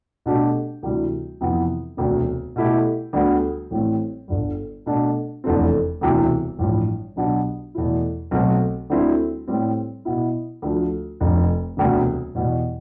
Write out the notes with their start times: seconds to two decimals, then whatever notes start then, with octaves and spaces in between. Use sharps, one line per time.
0.26 B2 A3 D4 G4
0.83 D2 C3 E3 G3
1.41 F2 C3 E3 B3
1.97 E1 D2 C3
2.56 B2 A3 E4 G4
3.13 D2 D3 G3 B3
3.71 A1 A2 G3 C4
4.28 G1 G2 D3 G3
4.86 B2 A3 D4
5.44 F1 E2 D3 A3 C4
6.01 E1 D2 C3 E3 G3
6.59 A1 G2 F3
7.16 B1 B2 B3 D4 G4
7.75 E2 B2 A3 E4
8.31 B1 B2 A3 C4
8.90 D2 D3 G3 C4 E4
9.48 A2 G3 C4
10.05 B2 B3 E4
10.62 D2 D3 F3 A3
11.20 F1 F2 D3
11.77 E1 D2 C3 G3 B3
12.35 E2 B2 G3